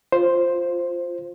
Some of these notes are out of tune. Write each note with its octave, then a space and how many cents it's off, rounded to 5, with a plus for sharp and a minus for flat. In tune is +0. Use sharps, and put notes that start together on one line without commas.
F4 +0 C5 +0